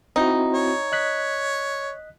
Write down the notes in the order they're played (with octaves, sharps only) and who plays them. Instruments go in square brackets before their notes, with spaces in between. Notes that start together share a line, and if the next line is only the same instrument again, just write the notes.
[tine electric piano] C4 E4 F#4 [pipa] D#4
[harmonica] C#5
[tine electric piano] D#5 F#6 B6